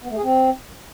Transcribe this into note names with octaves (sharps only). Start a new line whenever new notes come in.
B3
A3
G#4
C4